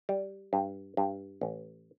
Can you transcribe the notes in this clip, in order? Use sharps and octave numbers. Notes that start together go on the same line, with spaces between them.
G3
G2
G2
A1